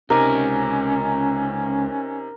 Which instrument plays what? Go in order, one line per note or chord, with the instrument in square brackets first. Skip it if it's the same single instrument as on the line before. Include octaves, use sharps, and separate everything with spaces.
[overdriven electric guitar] C#2 G#5 [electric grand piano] C3 D#4 D6 [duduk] C#4 [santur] A#4